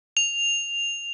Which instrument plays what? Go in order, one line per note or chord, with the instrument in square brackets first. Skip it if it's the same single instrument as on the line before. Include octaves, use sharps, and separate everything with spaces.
[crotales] F7